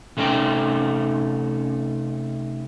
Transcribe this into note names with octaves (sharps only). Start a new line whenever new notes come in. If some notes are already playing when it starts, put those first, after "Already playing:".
C3 A3 C#4 D#4 G5